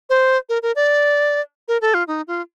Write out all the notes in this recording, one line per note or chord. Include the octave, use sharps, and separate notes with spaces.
C5
A#4
A#4
D5
A#4
A4
F4
D#4
F4